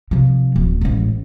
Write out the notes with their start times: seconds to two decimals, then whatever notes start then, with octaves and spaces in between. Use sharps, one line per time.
0.11 C3 F3
0.56 D1
0.81 A1 G#2